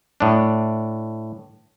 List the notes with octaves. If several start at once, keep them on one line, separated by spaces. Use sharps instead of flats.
A2 D4